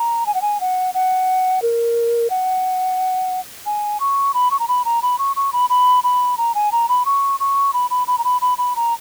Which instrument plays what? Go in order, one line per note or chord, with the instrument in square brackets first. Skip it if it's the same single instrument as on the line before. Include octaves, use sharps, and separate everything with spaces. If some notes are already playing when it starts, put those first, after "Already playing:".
Already playing: [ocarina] A#5
G#5
F#5
G#5
F#5
F#5
A#4
F#5
G#5
C#6
B5
C#6
A#5
B5
A#5
B5
C#6
C#6
B5
B5
B5
A#5
G#5
A#5
B5
C#6
C#6
B5
B5
B5
A#5
B5
B5
B5
A#5